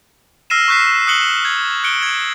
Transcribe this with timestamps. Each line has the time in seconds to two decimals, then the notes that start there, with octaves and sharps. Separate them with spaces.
0.50 E6 F6 A#6 C7 D#7 E7
0.68 C#6 E6 F#6 B6 C7
1.07 D#6 F#6 C#7 F#7 G7
1.45 G#6
1.84 F#6 C#7 D7 G7
2.03 G#6